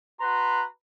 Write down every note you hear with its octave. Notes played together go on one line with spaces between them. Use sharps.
F#4 B4 A#5 C6